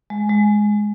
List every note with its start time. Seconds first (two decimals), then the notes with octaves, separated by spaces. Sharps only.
0.10 G#3
0.29 G#3